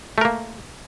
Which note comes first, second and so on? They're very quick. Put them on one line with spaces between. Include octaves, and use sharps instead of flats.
A3 A#4 A#3